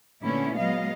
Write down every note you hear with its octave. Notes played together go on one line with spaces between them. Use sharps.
A#2 D3 A3 B3 C#4 E4
F#3 G#3 B3 D#5 F5